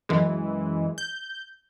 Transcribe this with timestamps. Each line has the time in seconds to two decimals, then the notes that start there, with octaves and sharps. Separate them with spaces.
0.09 F#2 E3 G#3
0.98 G6